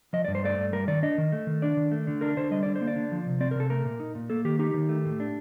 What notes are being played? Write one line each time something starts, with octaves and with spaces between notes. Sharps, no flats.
F3 D#5
G2 D5
C5
A3 D5
G2
G3 A#4
D#3 D5
D4 D#5
D#3
A3
D#3
D4 D5
D#3
A3
D3
D4 A#4
D3 C5
G3 D#5
D3 D5
C5
A#3
D5
D3
F3
C3
C4 D5
A#4
C3 A4
A3 A#4
A#2
D#4
A#2
A#3 A4
D#3 G4
D#4 G4
D#3
A3
A2
D4